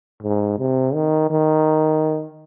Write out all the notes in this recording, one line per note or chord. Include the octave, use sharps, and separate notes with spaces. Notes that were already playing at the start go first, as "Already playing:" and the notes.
G#2
C3
D#3
D#3